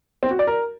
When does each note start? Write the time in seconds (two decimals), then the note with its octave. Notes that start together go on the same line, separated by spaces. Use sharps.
0.23 C4
0.31 F#4
0.39 D5
0.47 A#4